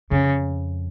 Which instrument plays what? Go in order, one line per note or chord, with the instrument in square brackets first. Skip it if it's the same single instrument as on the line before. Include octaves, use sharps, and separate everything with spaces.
[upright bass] F2 [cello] C#3